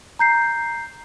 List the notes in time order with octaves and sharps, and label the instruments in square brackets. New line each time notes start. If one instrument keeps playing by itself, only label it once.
[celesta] A#5 G6 C7